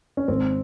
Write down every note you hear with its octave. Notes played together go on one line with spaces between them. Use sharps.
C#4
G#1 C4